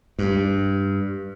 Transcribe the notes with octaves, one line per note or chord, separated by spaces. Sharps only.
G2